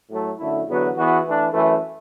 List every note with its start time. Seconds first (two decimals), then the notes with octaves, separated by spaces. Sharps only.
0.09 A2 F#3 A3
0.38 F#2 D3 A3 E4
0.67 E2 D3 F#3 B3 F#4
0.95 E2 E3 B3 F#4
1.24 E3 A3 D4
1.52 F#2 E3 A3